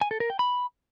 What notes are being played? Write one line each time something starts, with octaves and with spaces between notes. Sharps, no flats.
G#5
A4
A#4
G5
B5